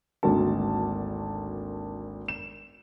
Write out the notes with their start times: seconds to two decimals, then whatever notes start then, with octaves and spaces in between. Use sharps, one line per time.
0.23 G#1 D2 A#3 A5
2.28 E7